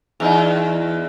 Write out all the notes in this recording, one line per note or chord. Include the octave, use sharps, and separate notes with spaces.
E2 D#4